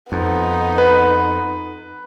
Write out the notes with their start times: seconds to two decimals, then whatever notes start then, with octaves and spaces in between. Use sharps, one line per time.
0.12 F2 B3 D#4
0.78 B4